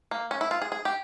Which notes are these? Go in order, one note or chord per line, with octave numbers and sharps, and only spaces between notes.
A#3
C#4
E4
F4
G#4
G#4
G4